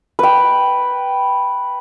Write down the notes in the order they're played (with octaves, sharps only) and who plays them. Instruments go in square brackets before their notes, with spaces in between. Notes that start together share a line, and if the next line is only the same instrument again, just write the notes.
[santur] B4 G5